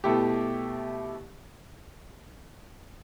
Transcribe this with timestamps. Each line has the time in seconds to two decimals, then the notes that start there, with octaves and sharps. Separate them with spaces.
0.04 B2 A3 E4 G4